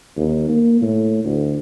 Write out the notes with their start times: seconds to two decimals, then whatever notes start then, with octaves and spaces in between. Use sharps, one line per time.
0.17 D#2
0.49 A#3
0.82 A2
1.24 D2